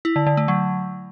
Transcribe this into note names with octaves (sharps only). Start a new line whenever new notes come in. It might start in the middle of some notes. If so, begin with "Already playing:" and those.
E4
D3
D3
A3
F#3